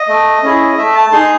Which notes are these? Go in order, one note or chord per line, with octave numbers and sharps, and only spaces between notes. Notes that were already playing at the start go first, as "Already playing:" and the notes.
Already playing: D#5
A3
C#4 E4 G#4
A3 E5
A5
D#4 G#4 C6